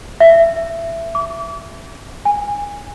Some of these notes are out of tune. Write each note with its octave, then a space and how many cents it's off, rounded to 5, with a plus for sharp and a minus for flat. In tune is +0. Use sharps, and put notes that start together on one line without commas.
E5 +15
D6 -35
G#5 -20